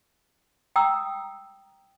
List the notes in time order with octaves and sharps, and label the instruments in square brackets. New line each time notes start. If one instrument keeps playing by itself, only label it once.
[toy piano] G5 A#5 D#6 E6